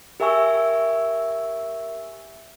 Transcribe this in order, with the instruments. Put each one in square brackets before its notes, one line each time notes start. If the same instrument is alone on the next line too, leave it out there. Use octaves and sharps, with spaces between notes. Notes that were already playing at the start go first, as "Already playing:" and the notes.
[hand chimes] G4 A#4 E5 G#5 C#6 E6